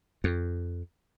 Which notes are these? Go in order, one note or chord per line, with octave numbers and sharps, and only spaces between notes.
F2